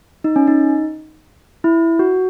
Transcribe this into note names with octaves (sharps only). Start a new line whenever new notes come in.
D#4
C#4
D#4
E4
F#4